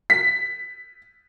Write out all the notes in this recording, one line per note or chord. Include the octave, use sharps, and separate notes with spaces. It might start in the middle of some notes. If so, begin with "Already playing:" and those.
B6